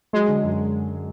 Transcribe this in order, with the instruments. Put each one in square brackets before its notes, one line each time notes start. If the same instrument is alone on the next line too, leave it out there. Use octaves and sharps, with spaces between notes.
[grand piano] F#3 [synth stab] G#3
[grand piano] D3
F#2